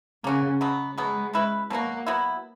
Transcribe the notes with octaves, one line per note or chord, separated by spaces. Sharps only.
C#3 A#3 C#4 F#4
B2 F#3 B3
B2 F#3 G#3 B3
G#3 C#4 E4 B4
B2 F#3 A#3 C#4 F#4
F#3 B3 E4